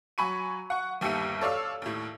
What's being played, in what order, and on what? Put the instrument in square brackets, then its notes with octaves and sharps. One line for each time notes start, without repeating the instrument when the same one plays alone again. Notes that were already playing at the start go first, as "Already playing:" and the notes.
[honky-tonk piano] F#3 G#5 B5 C#6 D#7
F#5 C#6
G1 D#2 G4 E5 C#7 D#7
A4 C#5 D5 F5 E6
D#2 A2